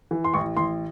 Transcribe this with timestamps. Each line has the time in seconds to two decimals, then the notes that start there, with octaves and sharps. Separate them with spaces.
0.11 E3
0.24 C6
0.34 A1 C#6
0.57 A1 C6